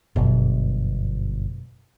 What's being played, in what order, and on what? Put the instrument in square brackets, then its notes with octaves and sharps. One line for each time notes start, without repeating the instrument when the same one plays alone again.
[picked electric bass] G1 [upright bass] F#2 B2